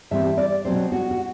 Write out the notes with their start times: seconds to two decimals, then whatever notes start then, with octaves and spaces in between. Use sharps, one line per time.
0.11 G2 E3 G3 C4 E5
0.37 D5
0.65 B2 F#3 C4 C5
0.92 F#4
1.11 F#4